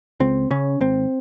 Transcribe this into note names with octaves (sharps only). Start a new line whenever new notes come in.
C#2 C4
C#3 C#4
G#1 C4